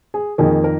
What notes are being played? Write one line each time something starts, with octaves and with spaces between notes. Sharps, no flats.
G#4
F2 D#3 A#3 G#4
A#4